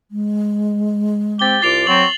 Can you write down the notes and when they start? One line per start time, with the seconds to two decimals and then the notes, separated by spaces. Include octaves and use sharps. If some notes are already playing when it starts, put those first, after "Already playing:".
0.11 G#3
1.39 C4 G4 A6 G7
1.62 C2 F4 D6 A6 C7 F7
1.87 F#3 C4 C#6 F#7